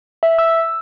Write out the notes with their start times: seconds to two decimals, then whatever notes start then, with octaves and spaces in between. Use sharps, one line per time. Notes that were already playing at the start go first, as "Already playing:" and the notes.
0.23 E5
0.39 E6